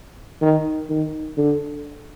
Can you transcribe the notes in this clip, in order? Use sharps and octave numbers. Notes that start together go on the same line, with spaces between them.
D#3
D#3
D3